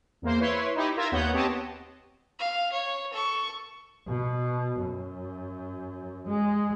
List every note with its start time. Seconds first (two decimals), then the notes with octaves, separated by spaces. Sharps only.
0.22 E2 A#3 C5
0.40 E4 B4 C#5 C6
0.75 D#4 E4 G4
0.97 F4 A#4 E5 G#6 A#6
1.11 D#2 B3 C#5 F#5 G6
1.32 B3 C4 G4 C#5 D#5 A5
2.39 F5
2.72 C#5
3.12 A4 C#6
4.08 B2
4.81 F#2
6.28 G#3